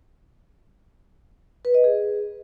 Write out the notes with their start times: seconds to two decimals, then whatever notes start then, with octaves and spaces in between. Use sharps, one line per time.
1.65 B4
1.74 D#5
1.84 G#4